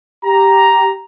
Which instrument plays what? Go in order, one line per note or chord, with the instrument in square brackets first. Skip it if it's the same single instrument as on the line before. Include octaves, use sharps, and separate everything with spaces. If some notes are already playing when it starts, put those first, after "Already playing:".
[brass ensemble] G4 A#5